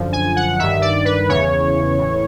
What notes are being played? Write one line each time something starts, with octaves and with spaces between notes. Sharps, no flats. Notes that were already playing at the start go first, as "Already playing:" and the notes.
Already playing: F#2 D3 F3
G#5
F#5
G2 D#3 E5
D5
B4
E2 C#3 E3 C#5
A2 E3